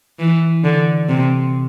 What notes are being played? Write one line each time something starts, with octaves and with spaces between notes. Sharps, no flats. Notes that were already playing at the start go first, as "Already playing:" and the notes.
E3
D3
C3